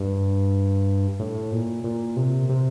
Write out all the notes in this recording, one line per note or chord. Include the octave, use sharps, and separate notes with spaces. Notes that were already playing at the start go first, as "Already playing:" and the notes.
Already playing: G2
A2
A#2
A#2
C3
C3